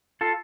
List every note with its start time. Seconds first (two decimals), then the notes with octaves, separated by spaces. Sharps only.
0.21 F4 A4